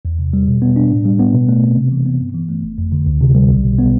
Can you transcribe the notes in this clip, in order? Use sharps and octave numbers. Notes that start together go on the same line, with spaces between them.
E2
C3
G3
B2
B3
D4
A2
G3
B3
B2
A3
C4
C3
E3
B3
G2
E3
A3
G1
F2
D3
D2
C3
G3
B1
B2
B3